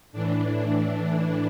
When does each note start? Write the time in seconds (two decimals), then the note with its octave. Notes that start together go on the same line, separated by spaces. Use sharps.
0.12 A2 E3 D4
0.77 D4